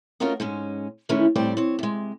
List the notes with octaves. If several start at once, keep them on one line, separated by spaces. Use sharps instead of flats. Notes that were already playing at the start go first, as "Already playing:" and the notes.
A3 C#4 F4 F#4 A#4 D#5
G#2 G#3 C#4
D#3 E3 G#3 A3 C#4 E4
A2 G3 C4 C5 D5
C4 C#5
C3 G#3